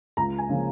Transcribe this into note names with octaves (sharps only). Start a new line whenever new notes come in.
C#2 A#5
G#5
C#3 F3 A#3